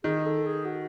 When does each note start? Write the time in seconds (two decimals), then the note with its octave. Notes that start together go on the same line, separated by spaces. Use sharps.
0.04 D#3 G#4
0.25 A4
0.46 G#4
0.65 F#4